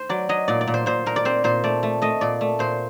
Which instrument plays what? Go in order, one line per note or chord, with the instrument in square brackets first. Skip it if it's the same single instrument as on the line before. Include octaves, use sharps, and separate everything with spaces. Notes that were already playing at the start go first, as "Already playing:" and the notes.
Already playing: [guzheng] C5
F#3 D5
F#3 D#5
A#2 D5
D5
A#2
C5
A#2 C5
A#2 A#4
D5
C4 C5
A#2 C5
A3 D5
A3
A3 D#5
A#2 D5
A3
A#2 C5